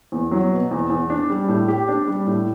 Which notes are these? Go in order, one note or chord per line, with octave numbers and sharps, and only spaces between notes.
E2
F#3
B2
E2
E2
D4
G3
A2
G4
D4
G3
A2